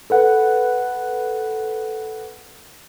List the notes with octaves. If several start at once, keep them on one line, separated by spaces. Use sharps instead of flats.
A4 B4 F#5